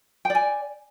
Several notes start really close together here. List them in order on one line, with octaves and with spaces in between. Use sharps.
G5 D5 G#5